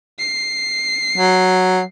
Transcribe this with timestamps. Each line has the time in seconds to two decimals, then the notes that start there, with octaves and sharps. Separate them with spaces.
0.19 C7
1.18 F#3